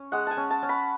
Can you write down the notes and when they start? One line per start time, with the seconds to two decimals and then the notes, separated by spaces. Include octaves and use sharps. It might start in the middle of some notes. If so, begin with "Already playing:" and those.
Already playing: C#4
0.12 G#3 F#5
0.27 G#5 A5
0.37 C#4
0.50 A5
0.63 C#4
0.69 B5